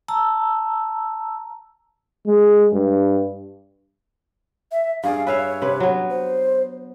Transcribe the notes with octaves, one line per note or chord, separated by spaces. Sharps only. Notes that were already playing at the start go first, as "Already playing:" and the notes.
A5 A#5 E6
G#3
G2
E5
G2 G#4 D5 F5
B4 C#5 E5 F5
C3 B4
F#3 B3
C5